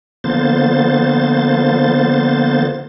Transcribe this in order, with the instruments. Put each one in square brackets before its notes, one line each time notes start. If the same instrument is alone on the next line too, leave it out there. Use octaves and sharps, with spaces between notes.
[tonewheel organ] D3 F3 A#3 B3 C5 A6